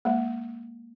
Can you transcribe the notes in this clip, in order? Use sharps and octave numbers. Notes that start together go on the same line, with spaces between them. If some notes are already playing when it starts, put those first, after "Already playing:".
G#3 A#3